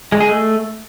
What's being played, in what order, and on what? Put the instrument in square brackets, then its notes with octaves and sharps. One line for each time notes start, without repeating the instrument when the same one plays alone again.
[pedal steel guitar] G#3
G#4
A3